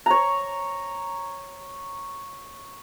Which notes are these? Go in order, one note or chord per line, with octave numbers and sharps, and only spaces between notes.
C#5 A#5